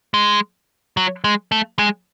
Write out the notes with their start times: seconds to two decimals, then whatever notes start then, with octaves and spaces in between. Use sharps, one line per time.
0.14 G#3
0.97 F#3
1.24 G#3
1.52 A3
1.79 G#3